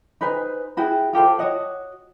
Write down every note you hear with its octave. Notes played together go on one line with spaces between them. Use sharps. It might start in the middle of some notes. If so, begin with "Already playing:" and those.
D#4 B4 C5 G#5
E4 F#4 G#4 G5
F4 G4 A4 C5
F#4 C#5 D#5 F#5